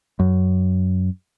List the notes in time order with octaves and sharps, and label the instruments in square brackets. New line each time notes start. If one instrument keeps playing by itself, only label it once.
[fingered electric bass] F#2